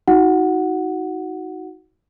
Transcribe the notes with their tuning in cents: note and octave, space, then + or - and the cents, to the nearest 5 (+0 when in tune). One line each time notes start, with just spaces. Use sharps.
D#4 +30 F#4 +0 F#5 +0